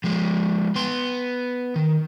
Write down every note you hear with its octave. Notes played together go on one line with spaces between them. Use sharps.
F3 G#3
B3 C6
D#3